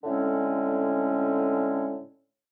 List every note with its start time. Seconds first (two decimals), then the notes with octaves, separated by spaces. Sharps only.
0.04 A2 D3 G#3 C4 C#4